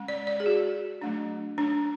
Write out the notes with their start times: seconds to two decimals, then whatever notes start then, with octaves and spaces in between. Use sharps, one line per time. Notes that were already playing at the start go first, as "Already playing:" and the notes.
Already playing: G#3 C#4
0.08 D5
0.27 D5
0.40 G#4
0.46 F#4
1.01 F#3 A3 D4
1.58 D4